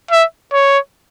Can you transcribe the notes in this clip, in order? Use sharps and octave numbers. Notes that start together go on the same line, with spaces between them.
E5
C#5